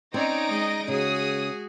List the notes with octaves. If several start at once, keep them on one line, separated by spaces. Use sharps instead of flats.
C4 C#4 D#4 C#5 D5 A#6 D7
G#3 D#5
C#3 G#3 F#4 G#4 D#6